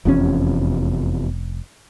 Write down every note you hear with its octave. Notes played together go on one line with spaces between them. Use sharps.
F1 E2 C3 F3 C#4